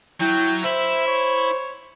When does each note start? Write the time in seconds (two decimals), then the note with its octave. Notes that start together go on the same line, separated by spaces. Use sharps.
0.20 F#3 E4 G5
0.64 E4 C5 E5
1.07 C#5